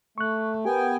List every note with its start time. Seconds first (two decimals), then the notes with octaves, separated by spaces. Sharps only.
0.18 A3 C#6 F#6
0.65 B3 G4 A#4 G5 G#5